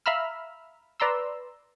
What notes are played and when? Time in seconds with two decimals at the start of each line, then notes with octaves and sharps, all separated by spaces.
0.06 E5 F5 A#5 B5 E6 F6
1.00 B4 D5 A#5 C6 E6